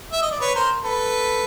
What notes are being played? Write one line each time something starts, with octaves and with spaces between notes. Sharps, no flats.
E5
D#5
D5
B4 C#5
A#4 C5
A4 B4